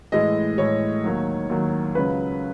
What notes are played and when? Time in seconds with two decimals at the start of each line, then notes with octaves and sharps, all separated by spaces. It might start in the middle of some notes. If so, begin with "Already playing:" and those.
0.12 A2 E3 G#3 D#5
0.58 A2 E3 G#3 C#5
1.04 D#2 D#3 F#3
1.49 D#2 D#3 F#3
1.95 C#2 C#3 F#3 B4